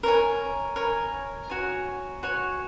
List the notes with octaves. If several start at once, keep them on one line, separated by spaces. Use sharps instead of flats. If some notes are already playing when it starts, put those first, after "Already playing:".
A#4 C#5 G#5
A#4 C#5 G#5
F#4 C#5 G#5
F#4 C#5 G#5